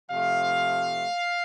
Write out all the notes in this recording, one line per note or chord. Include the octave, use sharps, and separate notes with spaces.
C3 F3 A3 F5